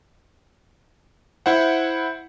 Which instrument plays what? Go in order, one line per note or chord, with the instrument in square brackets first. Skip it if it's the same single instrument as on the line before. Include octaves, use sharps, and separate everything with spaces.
[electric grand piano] E4 C5 F#5